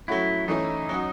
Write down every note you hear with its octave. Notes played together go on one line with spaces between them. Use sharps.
F#3 A3 C#4 E4 F#4
E3 A3 C#4 D#4 E4
F#3 C#4 F#4